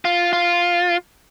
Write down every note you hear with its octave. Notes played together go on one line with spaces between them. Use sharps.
F4
F4